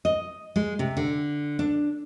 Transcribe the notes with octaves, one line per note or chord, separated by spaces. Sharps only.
D#5
G#3
C3
D3
D4